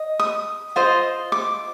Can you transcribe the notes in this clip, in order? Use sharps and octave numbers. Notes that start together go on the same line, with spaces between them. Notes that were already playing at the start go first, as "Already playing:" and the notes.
Already playing: D#5
D#6
F4 C5 D#5
D6